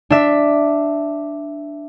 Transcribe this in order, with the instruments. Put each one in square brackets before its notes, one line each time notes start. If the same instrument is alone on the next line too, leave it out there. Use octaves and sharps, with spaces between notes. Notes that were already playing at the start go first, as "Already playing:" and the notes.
[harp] D4 E5